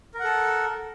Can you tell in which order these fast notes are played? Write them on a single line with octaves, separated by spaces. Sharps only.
A#4 F#5 A4